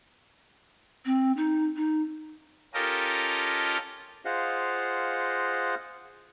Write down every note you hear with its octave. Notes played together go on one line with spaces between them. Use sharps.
C4
D#4
D#4
C#4 F4 G4 A4 A#4 D#5
F4 G#4 C5 D#5 F5 F#5